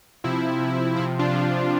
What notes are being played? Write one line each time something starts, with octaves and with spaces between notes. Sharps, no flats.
C3 F3 E4
C3 F3
C3 F3 E4
D4 F4
C3 F3